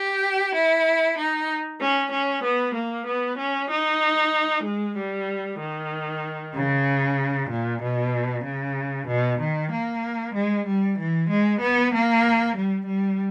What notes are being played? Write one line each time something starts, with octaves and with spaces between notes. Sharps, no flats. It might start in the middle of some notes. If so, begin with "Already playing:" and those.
Already playing: G4
E4
D#4
C#4
C#4
B3
A#3
B3
C#4
D#4
G#3
G3
D#3
C#3
A#2
B2
C#3
B2
D#3
A#3
G#3
G3
E3
G#3
B3
A#3
G3
G3